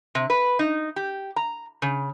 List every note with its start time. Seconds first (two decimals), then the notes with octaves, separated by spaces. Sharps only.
0.15 C3
0.30 B4
0.59 D#4
0.96 G4
1.36 A#5
1.82 C#3